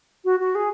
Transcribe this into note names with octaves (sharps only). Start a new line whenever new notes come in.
F#4
F#4
G#4